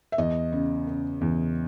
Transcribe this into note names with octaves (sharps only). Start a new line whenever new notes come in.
E5
E2 D#5
C#3
C#3
E2